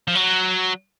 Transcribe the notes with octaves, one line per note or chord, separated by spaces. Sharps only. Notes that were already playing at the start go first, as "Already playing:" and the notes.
F3
F#3